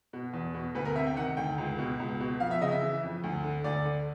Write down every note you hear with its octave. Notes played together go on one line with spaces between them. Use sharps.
B2
E2
B2
D2 B4
A#4
C3 E5
G5
D#3 F#5
D2 G5
C#2
B2
C#2
B2
F2 F5
E5
C#3 D#5
E5
E3
F2
D2
D3
D2 D5
D3